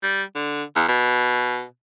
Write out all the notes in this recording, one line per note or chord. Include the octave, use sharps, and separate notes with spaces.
G3
D3
E2
B2